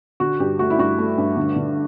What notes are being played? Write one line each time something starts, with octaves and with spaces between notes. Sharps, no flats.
D3 F#4
G2 G4
A3 F#4
E4
G2 F#4
A3
G2
D3
D3